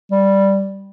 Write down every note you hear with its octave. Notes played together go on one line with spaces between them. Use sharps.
G3